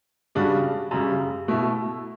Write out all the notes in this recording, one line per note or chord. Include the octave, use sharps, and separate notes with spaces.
C#3 G3 D4 F#4
F#2 C#3 G3
B2 A3 E4